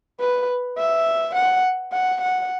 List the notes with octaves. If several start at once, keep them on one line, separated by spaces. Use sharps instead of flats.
B4
E5
F#5
F#5
F#5